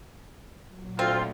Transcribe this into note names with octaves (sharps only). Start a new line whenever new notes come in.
A#2 F#3
D2 C4 F4